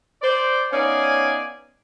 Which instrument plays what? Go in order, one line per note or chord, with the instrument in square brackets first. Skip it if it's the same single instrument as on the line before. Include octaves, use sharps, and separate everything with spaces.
[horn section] C5 D5
B3 C#4 D#4 D5 F5 G#5